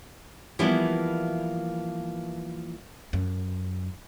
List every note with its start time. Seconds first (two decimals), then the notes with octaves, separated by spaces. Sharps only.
0.59 E3 F3 G3 A#3 B3 E4
3.13 F#2